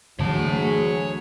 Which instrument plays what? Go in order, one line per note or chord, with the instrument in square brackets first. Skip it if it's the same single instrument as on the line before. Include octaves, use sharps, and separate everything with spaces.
[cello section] D2 G#4 [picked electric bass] D3 E3 G#3 [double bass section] F#3 [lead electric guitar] C#5 A5